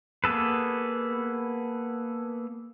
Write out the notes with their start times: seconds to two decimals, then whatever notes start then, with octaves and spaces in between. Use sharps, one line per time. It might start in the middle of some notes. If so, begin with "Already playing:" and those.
0.24 A#3 B3 G#4 A4 B4